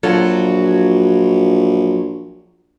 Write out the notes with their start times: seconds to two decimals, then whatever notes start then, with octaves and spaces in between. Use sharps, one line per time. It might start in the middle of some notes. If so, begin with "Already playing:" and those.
0.03 A#1 F#3 F4 A4